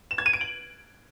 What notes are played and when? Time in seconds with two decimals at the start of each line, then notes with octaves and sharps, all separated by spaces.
0.11 E7
0.18 G#6
0.26 D#7
0.33 D7
0.41 F#7